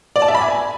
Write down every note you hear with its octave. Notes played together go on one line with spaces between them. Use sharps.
D5
A5
E5
B5
G#5